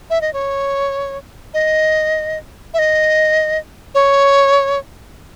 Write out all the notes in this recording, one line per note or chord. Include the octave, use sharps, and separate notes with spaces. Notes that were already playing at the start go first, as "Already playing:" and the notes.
E5
D#5
C#5
D#5
E5
D#5
C#5